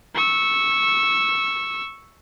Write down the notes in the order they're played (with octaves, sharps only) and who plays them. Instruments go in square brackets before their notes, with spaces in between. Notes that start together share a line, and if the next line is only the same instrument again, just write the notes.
[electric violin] C#6 E6